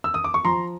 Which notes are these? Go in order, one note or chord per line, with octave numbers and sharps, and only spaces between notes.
E6
D#6
D6
C#6
F3 A#5 C6